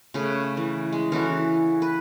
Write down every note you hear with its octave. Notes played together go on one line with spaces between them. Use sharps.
C#3 A3 B4
E3
G#3
E3 C#4 F#4 A4
B4